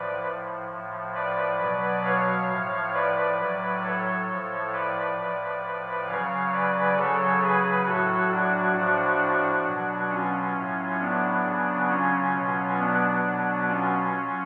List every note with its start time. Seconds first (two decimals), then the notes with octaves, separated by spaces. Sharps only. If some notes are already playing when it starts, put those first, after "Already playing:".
Already playing: A2 F3 B4 D5
0.70 A2 F3
1.14 B4 D5
1.59 B2 F#3
2.04 C#5 F5
2.48 A2 F3
2.93 B4 D5
3.38 A2 F#3
3.83 A4 C#5
4.28 A2 F3
4.72 B4 D5
5.17 A2 F3
6.07 C#3 F#3 C#5 F5
6.52 B4 D5
6.96 C#3 F#3 A4 C#5
7.41 G#4 B4
7.86 A2 F#3 F#4 A4
8.31 D4 F#4
8.75 A2 F3 D4 F#4
9.65 B2 F#3
10.09 C#4 F4
10.54 A2 F#3
10.99 B3 D4
11.43 C#3 F#3
11.88 C#4 F4
12.33 B2 F#3
12.77 B3 D4
13.23 B2 F#3
13.67 C#4 F4
14.12 F#3